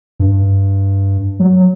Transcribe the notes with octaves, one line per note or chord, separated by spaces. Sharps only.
G2
F#3